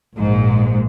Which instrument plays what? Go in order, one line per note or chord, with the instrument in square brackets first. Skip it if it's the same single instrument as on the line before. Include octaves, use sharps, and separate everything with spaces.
[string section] A#1 G#2